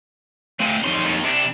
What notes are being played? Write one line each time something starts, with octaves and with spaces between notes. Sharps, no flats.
D3 A3 C4 F5 G#5
F2 G3 D#4 C#5 C6
D#2
C3 G3 D4